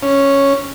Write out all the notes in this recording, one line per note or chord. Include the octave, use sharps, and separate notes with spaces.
C#4